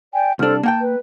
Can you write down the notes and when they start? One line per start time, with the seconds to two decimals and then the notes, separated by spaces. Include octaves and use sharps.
0.12 D5 G5 G#5
0.39 C2 D4 A4 C5 F6
0.63 A#3 F#5 G5 A5 G6
0.82 B4